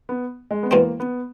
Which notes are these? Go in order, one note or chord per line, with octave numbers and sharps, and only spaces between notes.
B3
G#3
B3
E2 B2 G#3 A#3 C4
B3